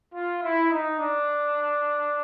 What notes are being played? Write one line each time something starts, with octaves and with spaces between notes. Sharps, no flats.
F4
E4
D#4
D4